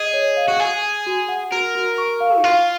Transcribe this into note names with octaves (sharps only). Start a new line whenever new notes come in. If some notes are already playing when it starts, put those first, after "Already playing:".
Already playing: G#4 D#5
C#5
F5
F#4
G#4 G#5
G#5
F#4
F#5
F#4 A#4
F#4
C#6
F5
D#4
F4 F5